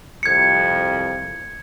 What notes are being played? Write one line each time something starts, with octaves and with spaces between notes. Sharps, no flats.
C2 F2 G#6 C#7